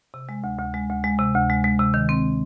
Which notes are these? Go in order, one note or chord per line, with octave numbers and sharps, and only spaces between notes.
C3
G#3
D2
D2
G#3
D2
G#3
C3
D2
G#3
G#3
C3
D#3
C4